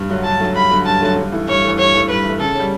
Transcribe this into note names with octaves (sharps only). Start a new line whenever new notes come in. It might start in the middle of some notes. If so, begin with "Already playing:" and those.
Already playing: G2
D3 F#3 A3
G2 A5
D3 F#3 A3
G2 B5
D3 F#3 A3
G2 A5
D3 F#3 A3
G2
E3 A3
G2 C#5
E3 A3
G2 C#5
E3 A3
G2 B4
E3 A3
C#3 A4
G3 C#4